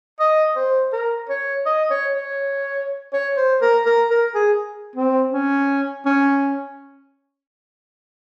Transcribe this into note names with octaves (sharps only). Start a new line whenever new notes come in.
D#5
C5
A#4
C#5
D#5
C#5
C#5
C#5
C5
A#4
A#4
A#4
G#4
C4
C#4
C#4